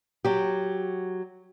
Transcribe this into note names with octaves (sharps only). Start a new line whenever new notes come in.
F#3 G4